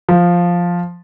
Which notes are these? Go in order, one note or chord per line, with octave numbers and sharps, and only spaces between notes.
F3